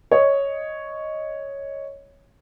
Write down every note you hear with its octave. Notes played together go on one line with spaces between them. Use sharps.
C#5 D#5